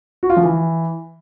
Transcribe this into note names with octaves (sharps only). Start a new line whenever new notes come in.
F#4
F4
F3
E3